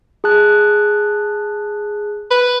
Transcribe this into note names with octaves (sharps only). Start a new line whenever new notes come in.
G#4 A5 F#6
B4